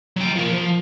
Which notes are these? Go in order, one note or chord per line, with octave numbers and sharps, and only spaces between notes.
F#3 G5
F3 A#4
F3